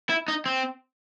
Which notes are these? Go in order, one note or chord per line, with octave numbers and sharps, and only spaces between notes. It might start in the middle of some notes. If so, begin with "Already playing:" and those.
E4
D#4
C4